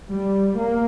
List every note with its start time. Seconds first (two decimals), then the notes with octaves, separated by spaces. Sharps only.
0.10 G3
0.58 A#3